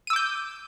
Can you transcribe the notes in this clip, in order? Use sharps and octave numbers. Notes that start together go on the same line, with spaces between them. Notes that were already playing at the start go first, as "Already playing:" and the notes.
D6 E6 G6 D#7